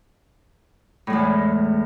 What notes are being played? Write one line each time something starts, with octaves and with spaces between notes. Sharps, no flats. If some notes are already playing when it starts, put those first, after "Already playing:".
E2 A2 G#3